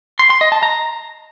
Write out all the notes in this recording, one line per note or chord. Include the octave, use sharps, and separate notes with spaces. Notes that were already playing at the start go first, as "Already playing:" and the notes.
C6
C6
D#5
A5
A#5